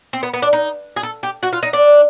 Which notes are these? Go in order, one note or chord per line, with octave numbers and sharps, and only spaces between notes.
C4
B3
B3
D4
D#4
G#4
A4
G4
F#4
F4
D#4
D4